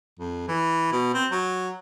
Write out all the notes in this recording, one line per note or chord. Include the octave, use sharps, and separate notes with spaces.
F2
E3
B2
C4
F#3